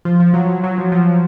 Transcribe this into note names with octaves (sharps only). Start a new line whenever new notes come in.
F3
F3
F#3
F#3
F3
F3